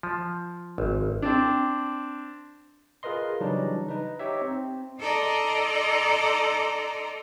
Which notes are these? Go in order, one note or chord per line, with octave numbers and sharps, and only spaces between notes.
F3
G#1
C4 D4
F4 G#4 A#4 B4 D#5 C6
C#3 E3 F#3 G3 D4 D#4
D#4 B4
D#4 G4 C#5 E5
C4
D#4 A4 D5 D#5 A#5 C6